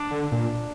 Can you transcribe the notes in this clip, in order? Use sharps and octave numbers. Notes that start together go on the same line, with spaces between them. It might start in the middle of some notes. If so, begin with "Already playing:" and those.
Already playing: D4
D3
A#2